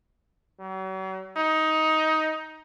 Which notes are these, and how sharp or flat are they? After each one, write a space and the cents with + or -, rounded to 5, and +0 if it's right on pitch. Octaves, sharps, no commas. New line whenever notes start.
F#3 +45
D#4 +15